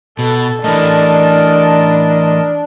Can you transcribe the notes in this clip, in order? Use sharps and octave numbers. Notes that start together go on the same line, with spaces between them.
B2 A4
E3 A3 D4 A#4 D#5 A5